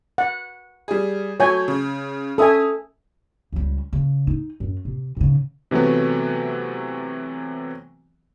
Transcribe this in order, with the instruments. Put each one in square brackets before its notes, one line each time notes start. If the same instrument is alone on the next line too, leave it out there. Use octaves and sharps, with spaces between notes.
[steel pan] F#5
[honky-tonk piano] G3 G#4
[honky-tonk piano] F#3 A3 G6 [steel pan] C#5 G#5
[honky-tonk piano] C#3
[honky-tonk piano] C#4 D#6 [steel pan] A4 E5 G#5
[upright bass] C#2 G3
C#3
D#4
F#2
C3
G#2 C#3
[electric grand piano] C3 E3 F#3 A3 B3